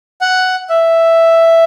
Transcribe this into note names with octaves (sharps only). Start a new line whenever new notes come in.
F#5
E5